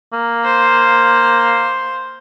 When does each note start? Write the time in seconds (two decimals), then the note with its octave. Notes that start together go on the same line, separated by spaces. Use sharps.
0.13 A#3
0.43 C5 F5